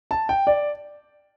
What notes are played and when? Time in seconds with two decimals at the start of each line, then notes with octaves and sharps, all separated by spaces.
0.11 A5
0.29 G5
0.47 D5